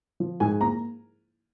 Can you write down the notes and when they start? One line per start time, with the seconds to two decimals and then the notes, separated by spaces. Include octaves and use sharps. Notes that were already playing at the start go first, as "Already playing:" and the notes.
0.20 F3
0.40 G#2 G#5
0.61 A#3 A#5